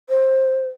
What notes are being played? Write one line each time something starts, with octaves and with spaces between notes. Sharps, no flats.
C5